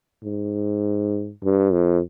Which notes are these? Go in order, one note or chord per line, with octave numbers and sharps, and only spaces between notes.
G#2
G2
F2